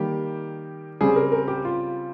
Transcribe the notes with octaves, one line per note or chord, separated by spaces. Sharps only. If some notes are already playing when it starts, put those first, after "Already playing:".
Already playing: D#3 G3 A#3 G4
C#3 G3 C4 G#4
A#4
A#4
G4
F4